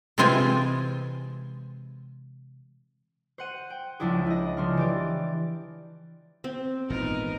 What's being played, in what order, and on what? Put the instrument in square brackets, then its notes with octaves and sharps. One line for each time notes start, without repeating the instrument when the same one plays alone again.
[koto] C3 E3 G#3 C4 F4 G#5
[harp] C5 F#5 D#7
G5
C#2 F3 D4 E4 G#4
E4 D#5
C#3 F3 D4 C6 F6
E3 G4 D5
[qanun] C4
[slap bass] G#1 A#2 E3 [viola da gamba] B3 D#4 A#4